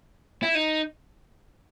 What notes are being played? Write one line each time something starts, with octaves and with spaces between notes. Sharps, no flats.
E4
D#4